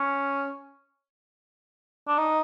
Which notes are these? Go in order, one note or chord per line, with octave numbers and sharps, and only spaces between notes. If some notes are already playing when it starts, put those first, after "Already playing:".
Already playing: C#4
D4
D#4